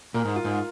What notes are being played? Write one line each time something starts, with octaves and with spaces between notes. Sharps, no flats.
A#2 A#4
G#2
F4
G#2